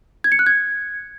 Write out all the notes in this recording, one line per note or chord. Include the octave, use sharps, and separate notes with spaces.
G#6
C#7
F#6
G#6